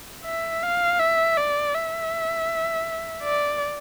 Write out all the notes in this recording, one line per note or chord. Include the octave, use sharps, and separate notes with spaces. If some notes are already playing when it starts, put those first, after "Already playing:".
E5
F5
E5
D5
E5
D5